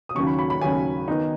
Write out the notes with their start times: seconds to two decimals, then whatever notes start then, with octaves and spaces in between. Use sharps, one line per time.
0.09 D#6
0.15 D#2 C#3 F#3 C#4 C#6
0.27 B5
0.39 B5
0.50 B5
0.61 D#2 C#3 F#3 C#4 G#5
1.08 D#3 B3 D#4